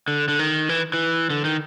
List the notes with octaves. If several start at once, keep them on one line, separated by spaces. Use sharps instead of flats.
D3
D3
D#3
E3
E3
D3
D#3